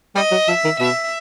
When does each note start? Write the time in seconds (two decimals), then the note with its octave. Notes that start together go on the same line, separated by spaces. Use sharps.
0.15 G3 D#5
0.31 F#3
0.48 F3 E5
0.64 D#3
0.80 B2 E5